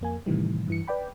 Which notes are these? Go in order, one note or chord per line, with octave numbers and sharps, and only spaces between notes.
F2 A#3 G#5
A2 C3 D#3 E3 G3
G2 E3 C#7
B4 D5 G5 B5